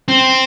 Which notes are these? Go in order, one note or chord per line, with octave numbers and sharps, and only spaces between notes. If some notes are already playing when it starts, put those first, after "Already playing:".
C4